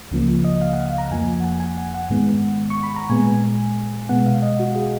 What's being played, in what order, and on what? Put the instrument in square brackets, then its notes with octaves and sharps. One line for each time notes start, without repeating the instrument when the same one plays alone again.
[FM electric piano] C#2 C#3 F3 A#3
D#5
F5
F#5
F5
A#5
F2 F3 A#3 G#5
F#5
G#5
G#5
F#5
F#5
G#2 D#3 G#3 B3
C#6
B5
A#5
A#2 G#3 B3 G#5
B2 G#3 B3 F#5
F5
D#5
F#4
G#4